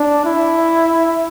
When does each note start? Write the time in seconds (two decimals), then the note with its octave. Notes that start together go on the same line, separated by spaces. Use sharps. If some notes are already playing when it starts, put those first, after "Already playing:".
Already playing: D4
0.26 E4